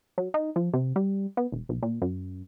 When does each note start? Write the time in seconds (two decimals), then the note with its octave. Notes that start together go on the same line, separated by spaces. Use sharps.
0.18 F#3
0.34 D#4
0.56 F3
0.73 C3
0.96 G3
1.37 B3
1.52 E1
1.69 B1
1.83 A#2
2.02 F#2